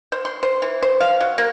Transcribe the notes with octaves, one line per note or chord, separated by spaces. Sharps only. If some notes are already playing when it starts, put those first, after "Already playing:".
C5
C6
C5
E3
C5
F5
F#3
A#3